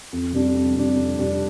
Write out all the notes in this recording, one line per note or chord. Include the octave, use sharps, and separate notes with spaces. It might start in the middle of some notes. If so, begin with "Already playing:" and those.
F2
C3 G3 D4
F2
C3 G3 D4
F2
C3 G3 D4